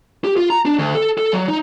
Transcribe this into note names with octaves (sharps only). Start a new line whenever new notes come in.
G4
F4
A#5
D4
D2
A4
A4
F#3
D#4